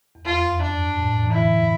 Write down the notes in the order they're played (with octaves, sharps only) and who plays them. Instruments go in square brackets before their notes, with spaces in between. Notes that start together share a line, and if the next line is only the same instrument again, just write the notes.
[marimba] E2
[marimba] F2 [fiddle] F4
[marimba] G2 [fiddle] D4
[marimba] A2
E3
[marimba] D3 [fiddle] E4